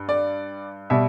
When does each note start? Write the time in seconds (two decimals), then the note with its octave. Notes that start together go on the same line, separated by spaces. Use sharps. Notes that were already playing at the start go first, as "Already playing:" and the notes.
Already playing: G2
0.09 D5
0.90 B2 G3 E5